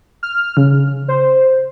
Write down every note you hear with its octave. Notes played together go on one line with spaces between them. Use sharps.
F6
C#3
C5